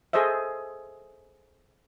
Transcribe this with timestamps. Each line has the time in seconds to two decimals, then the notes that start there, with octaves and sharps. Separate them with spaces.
0.13 G#4 A4 C5 D#5 E5